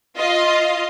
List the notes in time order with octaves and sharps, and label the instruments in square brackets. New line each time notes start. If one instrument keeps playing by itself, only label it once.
[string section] F4 D#5